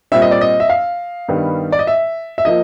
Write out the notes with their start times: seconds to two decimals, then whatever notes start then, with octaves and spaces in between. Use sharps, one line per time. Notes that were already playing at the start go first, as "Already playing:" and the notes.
0.12 A#2 G3 C4 E5
0.22 D#5
0.31 D5
0.41 D#5
0.60 E5
0.69 F5
1.29 G2 D#3 G3 B3
1.72 D5
1.79 D#5
1.87 E5
2.38 E5
2.45 F3 A#3 D#5